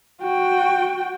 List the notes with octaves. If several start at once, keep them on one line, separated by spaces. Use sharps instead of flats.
F#4 G5